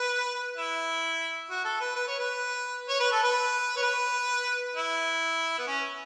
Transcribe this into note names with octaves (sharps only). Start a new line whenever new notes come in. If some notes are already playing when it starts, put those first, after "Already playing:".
Already playing: B4
E4
F#4
A4
B4
B4
C#5
B4
C#5
B4
A4
B4
C#5
B4
E4
B3
C#4